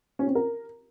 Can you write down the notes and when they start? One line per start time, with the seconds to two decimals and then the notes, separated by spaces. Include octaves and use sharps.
0.19 C#4
0.27 C4
0.35 A#4